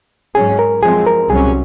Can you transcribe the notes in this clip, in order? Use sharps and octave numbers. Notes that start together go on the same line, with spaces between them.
G#2 F#3 C#4 G#4
A#4
F#2 F3 G#3 C4 G#4
A#4
C2 C3 F#3 C#4 G#4